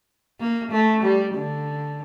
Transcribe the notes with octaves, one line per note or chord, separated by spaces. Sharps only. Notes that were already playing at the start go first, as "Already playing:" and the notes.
A#3
A3
G3
D3